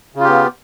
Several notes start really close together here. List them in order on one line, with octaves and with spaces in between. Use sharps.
C#3 F4 G4 B3